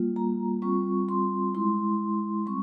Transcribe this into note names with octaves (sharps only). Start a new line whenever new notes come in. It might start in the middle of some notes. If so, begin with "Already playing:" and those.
Already playing: G3 A#3 F4
A#5
G3 C4 F4 C#6
C6
G#3 E4 C6
G3 C4 C#6